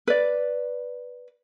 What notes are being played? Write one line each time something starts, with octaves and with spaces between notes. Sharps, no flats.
B4 D5